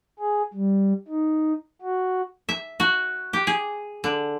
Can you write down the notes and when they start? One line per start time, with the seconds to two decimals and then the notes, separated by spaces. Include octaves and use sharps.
0.19 G#4
0.53 G3
1.08 D#4
1.81 F#4
2.49 E5
2.80 F#4
3.33 G4
3.47 G#4
4.04 D3